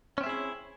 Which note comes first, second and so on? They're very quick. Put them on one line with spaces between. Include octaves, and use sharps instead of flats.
C#4 C4 E5 G#4 E4